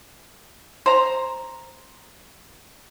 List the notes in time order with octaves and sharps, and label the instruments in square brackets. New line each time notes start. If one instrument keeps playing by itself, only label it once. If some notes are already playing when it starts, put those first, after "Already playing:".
[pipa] C5 A#5